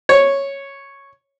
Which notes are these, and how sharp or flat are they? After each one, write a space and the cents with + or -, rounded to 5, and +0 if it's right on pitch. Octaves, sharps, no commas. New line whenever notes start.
C#5 -5